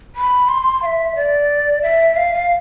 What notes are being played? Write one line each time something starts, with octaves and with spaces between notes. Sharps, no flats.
B5
C6
F5
E5
D5
E5
F5